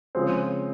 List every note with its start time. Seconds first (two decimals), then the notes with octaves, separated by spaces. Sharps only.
0.15 C#3 F3 G#3 C4